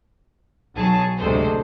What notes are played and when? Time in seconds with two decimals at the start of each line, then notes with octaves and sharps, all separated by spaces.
0.76 B1 F#3 G#4 A5
1.18 A1 D2 C3 G#3 A4 C5